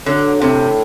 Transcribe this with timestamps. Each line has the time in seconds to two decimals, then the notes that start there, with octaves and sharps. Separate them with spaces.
0.06 D3 F#3
0.41 A2 C3